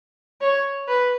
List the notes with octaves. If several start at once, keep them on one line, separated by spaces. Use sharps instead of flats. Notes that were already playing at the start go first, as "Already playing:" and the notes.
C#5
B4